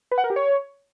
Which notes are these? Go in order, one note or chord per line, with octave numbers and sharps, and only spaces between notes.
B4
F#5
A#4
G4
C#5